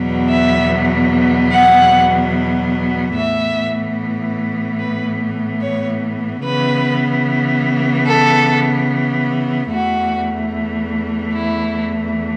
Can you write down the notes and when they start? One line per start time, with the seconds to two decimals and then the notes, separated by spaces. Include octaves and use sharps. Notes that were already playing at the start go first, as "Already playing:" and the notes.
Already playing: E2 B2 F#3 B3
0.29 E5
1.52 F#5
3.15 A2 E3 B3 E5
4.79 B4
5.61 C#5
6.43 C#3 E3 B3 B4
8.06 A4
9.70 E2 E3 A3 F#4
11.34 E4